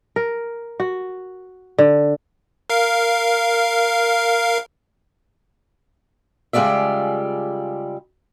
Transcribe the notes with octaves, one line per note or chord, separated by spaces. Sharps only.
A#4
F#4
D3
A#4 F5
C#3 G3 G#3 F4 D5 E5